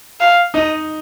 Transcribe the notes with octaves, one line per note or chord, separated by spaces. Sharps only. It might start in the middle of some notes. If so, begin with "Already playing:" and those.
F5
D#4 D#5